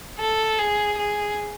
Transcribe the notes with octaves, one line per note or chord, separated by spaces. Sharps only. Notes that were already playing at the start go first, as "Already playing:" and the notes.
A4
G#4
G#4